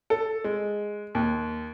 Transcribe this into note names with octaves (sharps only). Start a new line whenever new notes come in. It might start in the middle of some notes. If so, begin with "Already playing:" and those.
A4
G#3
D#2